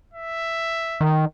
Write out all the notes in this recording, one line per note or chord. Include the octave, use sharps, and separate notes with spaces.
E5
D#3